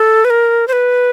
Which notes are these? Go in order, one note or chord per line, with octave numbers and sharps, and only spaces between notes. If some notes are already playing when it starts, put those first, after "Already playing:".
Already playing: A4
B4
A#4
C5
B4